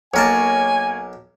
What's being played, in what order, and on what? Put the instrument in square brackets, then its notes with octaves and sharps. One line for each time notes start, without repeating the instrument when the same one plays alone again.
[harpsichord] B1 A#4 A5 [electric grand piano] A#3 C#5 [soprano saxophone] G#5